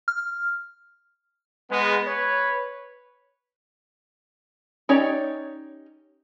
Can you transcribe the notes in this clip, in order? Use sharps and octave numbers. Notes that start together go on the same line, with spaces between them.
F6
G#3 B3
B4 C#5
C#4 D#4 G4 C#5 D5